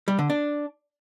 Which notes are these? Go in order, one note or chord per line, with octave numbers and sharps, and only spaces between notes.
G3
D3
D4